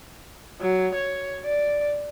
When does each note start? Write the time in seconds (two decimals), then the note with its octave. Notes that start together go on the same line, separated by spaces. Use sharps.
0.60 F#3
0.94 C#5
1.45 D5